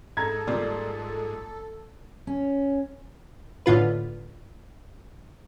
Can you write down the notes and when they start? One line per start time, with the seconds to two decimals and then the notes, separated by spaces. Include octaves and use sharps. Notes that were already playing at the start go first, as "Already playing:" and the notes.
0.17 G#2 A4 A#5 G#6
0.47 A#2 G3
2.27 C#4
3.66 A2 D3 F4 B4